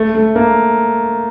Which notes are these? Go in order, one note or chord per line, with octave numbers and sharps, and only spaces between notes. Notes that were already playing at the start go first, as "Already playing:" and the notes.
Already playing: A3
A3
A#3